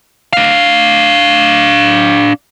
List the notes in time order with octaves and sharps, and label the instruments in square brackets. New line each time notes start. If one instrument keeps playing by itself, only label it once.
[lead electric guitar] D4 F5